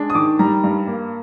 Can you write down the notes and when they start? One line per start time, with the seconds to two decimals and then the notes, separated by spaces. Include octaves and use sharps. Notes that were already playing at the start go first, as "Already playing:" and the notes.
Already playing: G#3 D4
0.10 D#6
0.15 D#3 D6
0.39 G3 A#5
0.64 G2
0.87 A#3